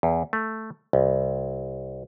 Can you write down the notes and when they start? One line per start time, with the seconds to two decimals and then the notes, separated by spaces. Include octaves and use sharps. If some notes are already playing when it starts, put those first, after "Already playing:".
0.03 E2
0.33 A3
0.93 C2